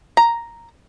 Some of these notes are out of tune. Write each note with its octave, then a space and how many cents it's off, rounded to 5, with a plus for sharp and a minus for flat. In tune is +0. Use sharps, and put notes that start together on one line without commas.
A#5 +0